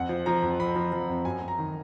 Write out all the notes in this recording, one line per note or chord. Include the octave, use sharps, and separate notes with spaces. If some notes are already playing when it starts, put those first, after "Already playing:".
Already playing: F2 F#5
F3
F3 A#5
F2
F2 B5
F3
F3
F2
F#2 G#5
F#2
A#5
D#3